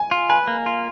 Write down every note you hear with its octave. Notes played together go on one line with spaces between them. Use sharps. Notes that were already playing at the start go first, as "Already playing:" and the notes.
Already playing: G#5
F4
B4 G#5
A#3
F4